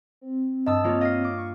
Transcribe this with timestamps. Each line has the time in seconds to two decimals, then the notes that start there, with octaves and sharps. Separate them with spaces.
0.21 C4
0.67 G2 D#5 A5 D#6 E6
0.84 A#3 F4 C#5
1.01 D#5 F5 F6 C7 D#7
1.24 D6
1.37 C#6